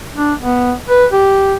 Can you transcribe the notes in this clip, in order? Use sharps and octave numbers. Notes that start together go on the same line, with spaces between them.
D4
B3
B4
G4